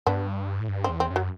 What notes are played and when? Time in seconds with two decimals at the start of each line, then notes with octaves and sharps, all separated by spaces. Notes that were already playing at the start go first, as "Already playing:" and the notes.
0.07 G2 B3 D4
0.60 A2
0.68 G2
0.84 C4
0.90 E2
1.00 C4
1.10 F#2
1.16 F#3